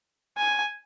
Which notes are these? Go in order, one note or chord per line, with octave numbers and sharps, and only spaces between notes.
G#5